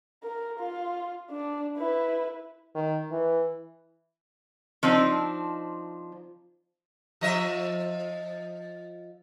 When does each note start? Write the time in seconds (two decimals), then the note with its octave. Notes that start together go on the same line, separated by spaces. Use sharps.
0.23 A#4
0.60 F4
1.31 D4
1.77 E4 B4
2.75 D#3
3.12 E3
4.83 F3 C4 D4 D#4
7.21 F3 D#5 E5